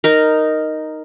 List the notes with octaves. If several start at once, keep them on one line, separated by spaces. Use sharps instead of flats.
D#4 A#4